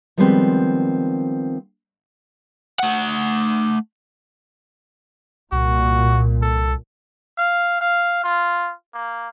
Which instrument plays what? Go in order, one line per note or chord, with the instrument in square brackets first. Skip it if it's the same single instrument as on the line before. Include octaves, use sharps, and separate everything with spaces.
[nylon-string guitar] D#3 F3 G3 G#3 B3 C4
[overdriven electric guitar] A3 F#5
[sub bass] C2 [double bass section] A#2 [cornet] F#4
[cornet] A4
[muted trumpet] F5
F5
F4
A#3